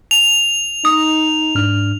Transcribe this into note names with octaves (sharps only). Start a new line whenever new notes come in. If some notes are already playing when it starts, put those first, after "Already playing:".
F7
D#4 D#6
G#2 D4 F6